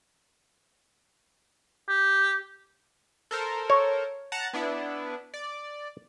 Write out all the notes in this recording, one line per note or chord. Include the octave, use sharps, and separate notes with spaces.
G4
A4 A#4 C5
C#5
F#5 A5 A#5
B3 D4 E4
D5